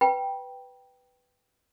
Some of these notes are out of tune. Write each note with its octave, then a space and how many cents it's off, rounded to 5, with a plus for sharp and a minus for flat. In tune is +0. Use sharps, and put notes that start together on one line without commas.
B4 +5 G5 +0 B5 -35